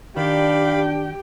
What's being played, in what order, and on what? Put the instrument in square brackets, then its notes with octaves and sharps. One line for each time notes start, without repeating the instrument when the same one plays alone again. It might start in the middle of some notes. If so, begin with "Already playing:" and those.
[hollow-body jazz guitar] D#3 [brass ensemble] D4 [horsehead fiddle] G4 G5 [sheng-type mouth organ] D5 F5 B5